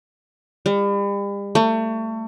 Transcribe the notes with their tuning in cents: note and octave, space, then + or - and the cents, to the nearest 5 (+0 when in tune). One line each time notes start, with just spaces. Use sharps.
G3 +40
A3 +30